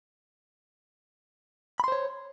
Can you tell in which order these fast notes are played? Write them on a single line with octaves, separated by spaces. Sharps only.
B5 C6 C5 C#5